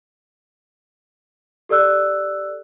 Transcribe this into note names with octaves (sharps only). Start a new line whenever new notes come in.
G4 A4 D5 E6 F#6